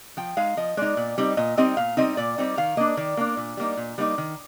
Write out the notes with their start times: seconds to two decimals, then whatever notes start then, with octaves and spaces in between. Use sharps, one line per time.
0.17 F3 G5
0.37 G#3 D#4 F5
0.57 F3 D#5
0.77 G#3 D#4 D5
0.97 A#2
1.18 G3 C4 D#4
1.37 A#2 D#5
1.57 G3 C4 D#4 D#5
1.77 A#2 F5
1.97 G3 C4 D#4 D#5
2.17 A#2 D5
2.38 G3 C4 D#4
2.57 D#3 F5
2.77 A#3 D4 D#5
2.97 D#3 D5
3.17 A#3 D4
3.37 A#2
3.57 G3 A#3 D#4
3.77 A#2
3.98 G3 A#3 D#4
4.18 D#3